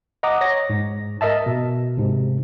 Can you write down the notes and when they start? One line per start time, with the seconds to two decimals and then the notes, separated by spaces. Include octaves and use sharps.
0.23 D#5 F#5 A#5 D6 D#6
0.41 C#5 A#6
0.70 G#2
1.21 A#4 D#5 E5 A5
1.46 B2
1.97 G#2 C3